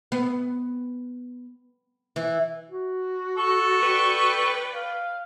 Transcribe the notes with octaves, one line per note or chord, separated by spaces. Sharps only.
B3
E3
F#4
A4 C#6
B4 D5 G5
F5